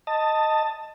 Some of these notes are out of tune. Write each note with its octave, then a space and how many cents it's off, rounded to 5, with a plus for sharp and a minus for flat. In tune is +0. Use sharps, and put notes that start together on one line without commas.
D#5 +0 A5 +15